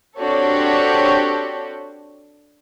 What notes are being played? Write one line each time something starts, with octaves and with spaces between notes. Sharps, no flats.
C4 D4 F#4 G4 A4 C#5